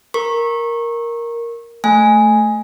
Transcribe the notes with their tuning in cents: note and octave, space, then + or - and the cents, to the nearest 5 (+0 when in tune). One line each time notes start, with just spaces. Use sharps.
A#4 +0 C#6 -25
A3 +0 G#5 +0